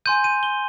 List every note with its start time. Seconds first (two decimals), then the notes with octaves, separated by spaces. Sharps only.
0.05 G#5 C6 G6 D#7
0.24 D#7
0.43 G7